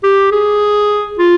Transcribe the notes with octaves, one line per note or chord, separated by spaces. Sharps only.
G4
G#4
F4